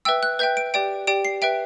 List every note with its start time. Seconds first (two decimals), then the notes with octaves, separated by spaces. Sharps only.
0.05 B4 E5 G5 E6
0.23 F#6
0.39 B4 E5 G5 G6
0.57 D7
0.74 G4 D5 G5 D7
1.07 G4 D5 G5 D7
1.25 C7
1.42 B4 E5 G5 D7